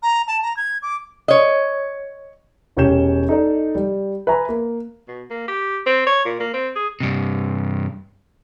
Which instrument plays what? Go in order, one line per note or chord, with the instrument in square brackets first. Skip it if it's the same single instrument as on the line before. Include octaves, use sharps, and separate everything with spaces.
[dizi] A#5
A5
A#5
G#6
D6
[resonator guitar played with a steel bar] C#5 D#5
[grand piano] E1 C#4 G4 C#5 G6 E7
D#4 A4 D5 D#5
G3
B4 E5 G#5 A#5 B5
A#3
[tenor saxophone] B2
A#3
G4
C4
C#5
A#2
A#3
C4
G#4
[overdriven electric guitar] G2 C3